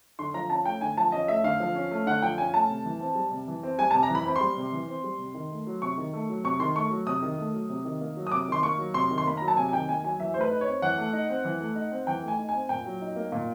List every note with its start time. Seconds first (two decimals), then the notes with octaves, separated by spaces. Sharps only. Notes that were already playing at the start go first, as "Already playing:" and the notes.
0.19 D3 C6
0.34 F3 A#5
0.50 C#4 A5
0.65 A3 G5
0.81 D3 G#5
0.97 F3 A5
1.12 C#4 D#5
1.28 A3 E5
1.44 D3 F5
1.60 F3
1.75 C#4
1.91 A3
2.07 D3 F#5
2.22 F3 G5
2.37 C#4 G#5
2.53 A3 A5
2.69 C3
2.85 E3
3.00 C4
3.15 G3
3.31 C3
3.47 E3
3.63 C4
3.78 G3 G#5
3.91 C3 A5
4.03 A#5
4.09 E3
4.15 B5
4.25 C4 B5
4.36 G3 C6
4.57 C3
4.72 E3
4.88 C4
5.04 G3
5.19 C3
5.34 D#3
5.51 A3
5.67 F#3
5.82 C3 C#6
5.98 D#3
6.13 A3
6.29 F#3
6.44 C3 C#6
6.60 D#3 C6
6.75 A3 C#6
6.91 F#3
7.07 C3 D#6
7.22 D#3
7.38 A3
7.54 F#3
7.69 C3
7.85 D#3
8.01 A#3
8.17 F#3
8.27 D#6
8.32 C3 D6
8.48 D#3 C6
8.63 A#3 C#6
8.79 F#3
8.94 C3 C6
9.11 D#3
9.18 C6
9.26 A#3 B5
9.37 F#3 A#5
9.48 A5
9.57 C3 G#5
9.69 G#5
9.72 D#3 G5
9.88 A#3 G#5
10.04 F#3 G#5
10.19 E3 E5
10.34 A3 C5
10.41 B4
10.51 D#4
10.61 C#5
10.67 C4
10.82 E3 F#5
10.98 A3
11.13 D#4
11.29 C4
11.45 E3
11.61 A3
11.75 D#4
11.92 C4
12.07 E3 G5
12.22 A3
12.28 G#5
12.39 D#4
12.49 G#5
12.54 C4
12.69 A#2 G5
12.86 F#3
13.02 D#4
13.16 A#3
13.32 A#2